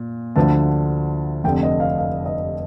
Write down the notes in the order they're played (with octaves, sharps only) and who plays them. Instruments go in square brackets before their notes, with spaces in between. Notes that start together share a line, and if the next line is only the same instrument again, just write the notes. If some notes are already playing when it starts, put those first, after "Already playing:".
Already playing: [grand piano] A#2
D2 D3 F3 A5
F1 F2 D3 G5
D#5
F5
F5
D#5